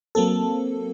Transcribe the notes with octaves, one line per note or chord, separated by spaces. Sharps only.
F#3 A#3 C4 A4